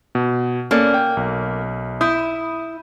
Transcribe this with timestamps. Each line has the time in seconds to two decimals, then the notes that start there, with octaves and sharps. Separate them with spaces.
0.15 B2
0.71 A#3 C#4 A4 D5
0.94 G5
1.17 B1
2.01 E4 D#6 G6